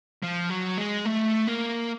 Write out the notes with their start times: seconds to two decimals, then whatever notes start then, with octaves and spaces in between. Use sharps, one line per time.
0.23 F3
0.50 F#3
0.78 G#3
1.05 A3
1.48 A#3